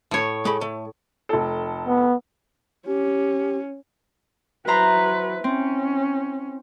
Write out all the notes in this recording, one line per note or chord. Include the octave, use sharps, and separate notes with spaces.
A2 C#5
G#3 A3 B5
A3
F1 A4
B3
C#4 G4
F#3 E4 B4 C5 A#5
C4 C#4